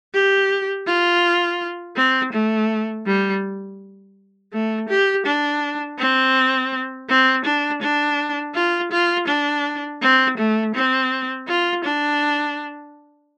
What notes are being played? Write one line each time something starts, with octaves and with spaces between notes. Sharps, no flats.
G4
F4
C4
A3
G3
A3
G4
D4
C4
C4
D4
D4
F4
F4
D4
C4
A3
C4
F4
D4